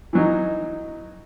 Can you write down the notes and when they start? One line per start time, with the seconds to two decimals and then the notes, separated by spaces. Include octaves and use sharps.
0.13 E3 F#3 D#4